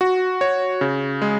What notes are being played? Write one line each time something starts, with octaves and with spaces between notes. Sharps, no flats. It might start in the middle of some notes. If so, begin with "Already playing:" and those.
F#4
C#5
C#3
G#3